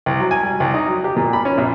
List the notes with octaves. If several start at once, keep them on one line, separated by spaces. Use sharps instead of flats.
C2
F#3
G#5
G3
C2
D#4
F#3
G4
A#2
B5
C#4
A#1